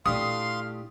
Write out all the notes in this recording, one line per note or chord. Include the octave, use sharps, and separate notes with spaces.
A#2 A3 D4 E4 G4 F5 C6 D#6